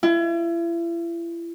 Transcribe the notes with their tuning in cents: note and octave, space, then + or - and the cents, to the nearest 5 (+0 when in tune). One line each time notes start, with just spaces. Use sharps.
E4 +40